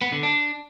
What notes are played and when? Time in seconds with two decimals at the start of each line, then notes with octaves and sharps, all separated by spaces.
0.01 B3
0.12 D3
0.23 D4